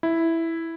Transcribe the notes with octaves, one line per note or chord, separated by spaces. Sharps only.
E4